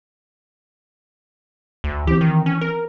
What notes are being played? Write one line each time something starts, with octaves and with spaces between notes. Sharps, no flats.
D2
E3 C4 G4
D#3
C#4
A#4